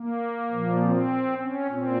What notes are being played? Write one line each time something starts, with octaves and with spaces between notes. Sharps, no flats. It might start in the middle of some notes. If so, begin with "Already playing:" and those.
Already playing: A#3
A#2 F3
C4
C#4
A#2 C4